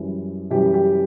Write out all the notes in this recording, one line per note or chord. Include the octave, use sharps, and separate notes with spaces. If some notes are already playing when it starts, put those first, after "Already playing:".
Already playing: F#2 E3 G3
F#2 E3 G3 G4
G4